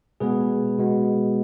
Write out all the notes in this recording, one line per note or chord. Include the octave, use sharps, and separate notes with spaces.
B2 G#3 B3 G#4 B4
B2 G#3 B3